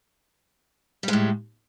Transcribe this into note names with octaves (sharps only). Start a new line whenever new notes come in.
A2 G3 G#3